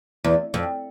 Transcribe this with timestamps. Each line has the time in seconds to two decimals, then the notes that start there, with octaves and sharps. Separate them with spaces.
0.24 E2
0.54 F2